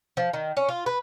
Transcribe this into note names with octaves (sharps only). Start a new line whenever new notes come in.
F3
D#3
C#4
F4
B4